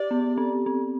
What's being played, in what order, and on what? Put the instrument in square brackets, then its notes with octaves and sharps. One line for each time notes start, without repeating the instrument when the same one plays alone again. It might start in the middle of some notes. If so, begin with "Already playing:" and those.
Already playing: [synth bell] G4 [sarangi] D5
[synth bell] B3
C4
C4